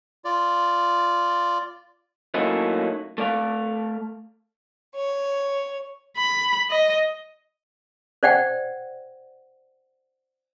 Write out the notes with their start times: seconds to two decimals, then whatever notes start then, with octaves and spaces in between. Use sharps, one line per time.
0.25 F4 D5
2.34 F#3 A3 A#3 C#4 D#4 E4
3.18 A3 D5 F5
4.94 C#5
6.17 B5
6.70 D#5
8.23 C5 D5 F#5 G5